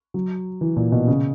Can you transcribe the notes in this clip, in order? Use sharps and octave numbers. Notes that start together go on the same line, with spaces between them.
F#3
E3
A#2
B2
C#3